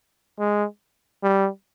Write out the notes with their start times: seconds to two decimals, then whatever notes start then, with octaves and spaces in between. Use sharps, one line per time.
0.40 G#3
1.23 G3